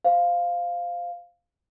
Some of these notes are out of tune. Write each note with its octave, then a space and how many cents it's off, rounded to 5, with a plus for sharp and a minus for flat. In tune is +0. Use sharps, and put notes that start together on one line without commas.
C5 -10 F5 +0